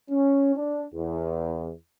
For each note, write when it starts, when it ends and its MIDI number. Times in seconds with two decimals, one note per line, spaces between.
0.10 0.53 61
0.56 0.84 62
0.94 1.72 40